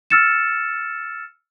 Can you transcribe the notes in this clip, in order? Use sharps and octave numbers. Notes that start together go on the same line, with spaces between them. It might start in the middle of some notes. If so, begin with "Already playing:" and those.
E6 F6 A6 C#7 E7